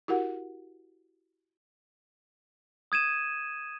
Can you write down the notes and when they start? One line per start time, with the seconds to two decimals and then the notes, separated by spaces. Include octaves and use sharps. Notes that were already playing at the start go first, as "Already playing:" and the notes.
0.08 E4 F#4 G4 A#4 F#5
2.92 D#6 G#6 D#7 E7